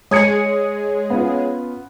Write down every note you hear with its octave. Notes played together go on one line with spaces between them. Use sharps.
G#3 G#4 C#5 D#6 G#6 C#7
B3 C#4 F4